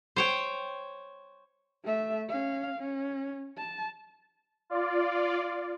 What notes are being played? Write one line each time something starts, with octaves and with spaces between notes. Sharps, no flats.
C5 C#5 G5
A3 E5
C#4 F5
C#4
A5
F4 D5